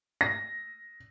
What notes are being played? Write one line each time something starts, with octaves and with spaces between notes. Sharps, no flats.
A#6